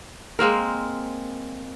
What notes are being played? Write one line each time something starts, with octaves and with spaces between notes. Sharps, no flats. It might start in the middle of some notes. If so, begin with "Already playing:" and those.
G#3 A#3 C4 A#4